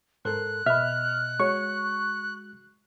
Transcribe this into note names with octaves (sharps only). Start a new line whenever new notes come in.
G#2 A4 A#4 C5 F#6
B2 D#5 E5 B5 F6
G#3 F#4 C#5 C#6